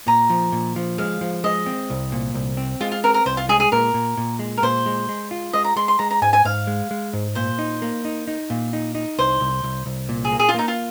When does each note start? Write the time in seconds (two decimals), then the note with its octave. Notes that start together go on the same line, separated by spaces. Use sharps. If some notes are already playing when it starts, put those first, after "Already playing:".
0.07 A#2 A#5
0.30 F3
0.52 A#2
0.76 F3
0.98 G#3 F5
1.21 F3
1.44 G#3 D#5
1.66 C4
1.90 C2
2.12 A#2
2.34 C2
2.57 C4
2.81 G#3 F4
2.92 F4
3.04 C4 A#4
3.14 A#4
3.26 C2 C5
3.37 F4
3.49 G#3 G#4
3.60 G#4
3.72 A#2 A#4
3.94 A#2
4.17 A#2
4.39 G#3
4.57 A#4
4.62 A#2 C5
4.86 G#3
5.09 G#3
5.31 F4
5.53 G#3 D#5
5.64 A#5
5.76 G#3 C6
5.88 C6
5.99 G#3 A#5
6.11 A#5
6.22 G#2 G#5
6.33 G#5
6.45 G#2 F5
6.67 G#3
6.91 G#3
7.13 G#2
7.35 A#2 C5
7.59 D#4
7.82 A#3
8.05 D#4
8.28 D#4
8.50 A#2
8.73 D#4
8.95 D#4
9.18 C2 C5
9.41 C2
9.63 C2
9.86 C2
10.09 A#2
10.25 G#4
10.32 A#3
10.39 G#4
10.49 F4
10.55 A#3 D#4
10.68 F4